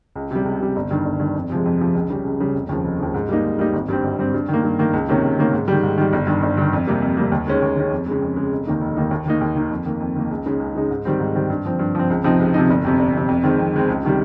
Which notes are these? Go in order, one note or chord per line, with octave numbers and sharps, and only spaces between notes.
C#2
C3 G3
C#2
C3 G3
G1
G2 D#3
G1
G2 D#3
F2
C3 F3 G#3
F2
C3 F3 G#3
C#2
C#3 G3
C#2
C#3 G3
F1
D#2 C#3 F3
F1
D#2 C#3 F3
G#2
G3 A#3 D#4
G#2
G3 A#3 D#4
G#1
G2 G3 C4
G#1
G2 G3 C4
G2
D#3 A#3
G2
D#3 A#3
C#2
C3 D#3 A#3 C#4
C#2
C3 D#3 A#3 C#4
G#2
D#3 G3
G#2
D#3 G3
G1
G2 D#3
G1
G2 D#3
F2
C3 G3 A#3
F2
C3 G3 A#3
D#2
D#3 G#3 C#4
D#2
D#3 G#3 C#4
F2
C#3 G#3
F2
C#3 G#3
F1
D#2 D#3 A#3 D#4
F1
D#2 D#3 A#3 D#4
D#2
D#3 A#3 D#4
D#2
D#3 A#3 D#4
F2
D#3 A#3
F2
D#3 A#3
C#2
C#3 G#3 D#4
C#2
C#3 G#3 D#4
G#2
D#3 G3 C4
G#2
D#3 G3 C4
G2
F3 C4
G2
F3 C4
C#2
C3 F3 C4 D#4
C#2
C3 F3 C4 D#4
G1
F2 C3
G1
F2 C3
F2
D#3 G#3 C4
F2
D#3 G#3 C4
C#2
C3 D#3 G3